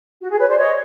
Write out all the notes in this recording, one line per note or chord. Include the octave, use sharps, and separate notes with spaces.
F#4
G#4
B4 C#5
C5 D5
C#5 D#5